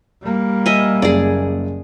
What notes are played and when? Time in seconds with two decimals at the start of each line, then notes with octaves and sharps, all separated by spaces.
0.22 G3 A#3
0.66 D#5 E5 G#5
1.02 F#1 G#4 D5